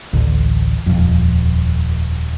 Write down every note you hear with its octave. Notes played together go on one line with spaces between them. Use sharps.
A1 D2
D#1 F2